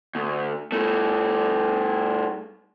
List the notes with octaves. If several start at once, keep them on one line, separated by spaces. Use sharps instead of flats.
D2
G2 A3